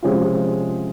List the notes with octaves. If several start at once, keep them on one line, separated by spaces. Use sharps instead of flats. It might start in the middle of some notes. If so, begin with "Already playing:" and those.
C3 F3 G#3 C#4 F4